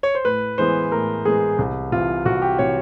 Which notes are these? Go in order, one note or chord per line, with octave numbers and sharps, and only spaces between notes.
C#5
C5
A2 B4
E3 G#3 B3 C5
A2 A#4
E3 G#3 B3 G#4
C2
C3 E3 F4
C2 F#4
G4
C3 E3 C#5